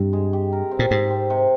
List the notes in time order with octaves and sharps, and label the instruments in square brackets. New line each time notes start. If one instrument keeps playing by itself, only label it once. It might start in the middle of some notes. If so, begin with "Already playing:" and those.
Already playing: [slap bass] G2 [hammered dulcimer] C3
[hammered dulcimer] G#3
G4
A#4
C4
[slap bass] A#2
[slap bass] G#2 [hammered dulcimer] G4
[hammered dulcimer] C4
C3